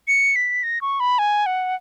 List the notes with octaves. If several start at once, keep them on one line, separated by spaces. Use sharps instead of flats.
C#7
B6
A#6
C#6
B5
G#5
F#5